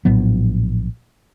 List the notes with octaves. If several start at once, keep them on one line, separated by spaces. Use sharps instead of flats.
A#1 A2 F#3 B3